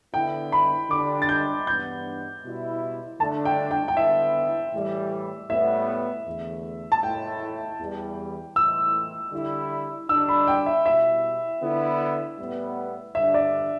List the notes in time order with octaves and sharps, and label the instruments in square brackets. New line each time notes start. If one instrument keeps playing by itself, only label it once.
[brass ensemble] D3 B3 E4 [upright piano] G5
[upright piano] B5
[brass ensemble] D3 G3 D4 [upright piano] D6
[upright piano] A6
G6
[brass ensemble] G2 E3 B3 D4 [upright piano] G6
[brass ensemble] B2 G3 E4
[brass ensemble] D3 A3 D4 [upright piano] A5
[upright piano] G5
G5
G5
[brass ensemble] D3 B3 E4 [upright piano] E5
[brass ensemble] A2 E3 G3
[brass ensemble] A2 G3 B3 [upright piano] E5
[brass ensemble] E2 D3 A3
[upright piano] A5
[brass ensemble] A2 A3 E4 [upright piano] G5
[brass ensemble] E2 E3 G3
[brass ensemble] A2 E3 A3 E4 [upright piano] E6
[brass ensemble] D3 G3 E4
[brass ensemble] D3 G3 D4 [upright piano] E6
[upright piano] B5
G5
E5
[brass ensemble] B2 G3 E4 [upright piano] E5
[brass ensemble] D3 B3 E4
A2 G3 B3
[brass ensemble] G2 D3 G3 D4 [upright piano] E5
[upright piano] D5